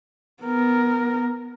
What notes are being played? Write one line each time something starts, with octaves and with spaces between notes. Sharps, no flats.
B3 A#4